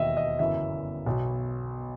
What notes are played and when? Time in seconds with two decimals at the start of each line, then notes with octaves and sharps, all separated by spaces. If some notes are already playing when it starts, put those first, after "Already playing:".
Already playing: E1 D#2 D#3 D#5 E5
0.17 D#5
0.39 G1 F#2 E3 E5
1.07 B1 B2